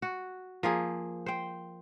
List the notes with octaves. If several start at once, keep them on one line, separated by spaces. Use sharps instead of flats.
F#4
F3 A#3 G#4
C5 G5